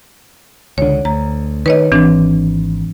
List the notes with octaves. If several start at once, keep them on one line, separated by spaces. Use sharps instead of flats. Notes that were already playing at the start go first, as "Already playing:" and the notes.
C#2 D3 C#5
D2 A#5
D#3 B4 C#5 D#5
G#1 E3 C4 D4